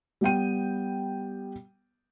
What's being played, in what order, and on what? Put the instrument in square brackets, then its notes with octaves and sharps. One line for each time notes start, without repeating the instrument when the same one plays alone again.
[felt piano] G3 B3 G5 D#7